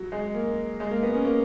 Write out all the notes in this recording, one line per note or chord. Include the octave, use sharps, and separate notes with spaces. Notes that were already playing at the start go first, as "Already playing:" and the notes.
Already playing: F#3
G#3
A#3
G#3
A#3
B3
C#4
A#3